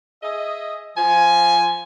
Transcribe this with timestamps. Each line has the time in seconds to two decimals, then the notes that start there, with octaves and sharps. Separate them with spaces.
0.23 G#4 D#5 E5
0.97 F3 G#5